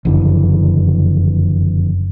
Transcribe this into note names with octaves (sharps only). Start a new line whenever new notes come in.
F#1 F2 D3 E3